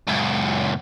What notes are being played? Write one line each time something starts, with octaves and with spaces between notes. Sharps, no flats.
C#2 F#2